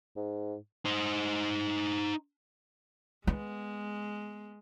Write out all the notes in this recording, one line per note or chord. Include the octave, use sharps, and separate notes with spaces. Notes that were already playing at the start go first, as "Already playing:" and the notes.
G#2
D#4 C5
G#3 B3